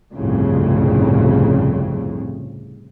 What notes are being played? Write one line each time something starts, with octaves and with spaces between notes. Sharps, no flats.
G1 C2 F2 A2 C#3